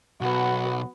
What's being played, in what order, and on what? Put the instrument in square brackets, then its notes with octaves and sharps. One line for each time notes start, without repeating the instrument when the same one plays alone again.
[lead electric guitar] B1 [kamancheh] B3 F#4